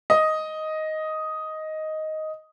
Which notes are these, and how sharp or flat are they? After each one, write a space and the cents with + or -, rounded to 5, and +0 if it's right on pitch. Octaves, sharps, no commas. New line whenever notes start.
D#5 +5